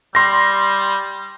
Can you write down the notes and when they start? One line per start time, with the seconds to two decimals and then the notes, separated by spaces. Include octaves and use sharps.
0.15 G3 C6 A#6